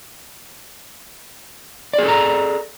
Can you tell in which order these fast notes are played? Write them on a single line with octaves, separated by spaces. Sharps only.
D5 G#4 A4 A#5